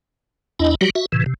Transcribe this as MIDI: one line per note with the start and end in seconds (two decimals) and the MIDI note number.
0.59 0.75 40
0.59 0.75 62
0.59 0.75 64
0.59 0.75 75
0.81 0.90 54
0.81 0.90 55
0.81 0.90 66
0.81 0.90 67
0.95 1.06 66
0.95 1.06 76
1.12 1.24 45
1.12 1.24 48
1.12 1.24 52
1.26 1.34 48